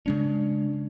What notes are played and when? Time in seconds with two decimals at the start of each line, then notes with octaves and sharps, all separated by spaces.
0.06 C#3 G#3 C#4 D4